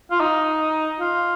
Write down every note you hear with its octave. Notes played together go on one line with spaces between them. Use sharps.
F4
D#4
F4